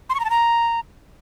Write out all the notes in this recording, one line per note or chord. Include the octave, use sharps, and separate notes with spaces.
C6
C#6
A#5
A5
A#5